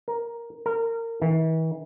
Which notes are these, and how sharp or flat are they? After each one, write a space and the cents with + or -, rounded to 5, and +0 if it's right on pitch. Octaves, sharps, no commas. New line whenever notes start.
A#4 +5
A#4 -25
E3 -40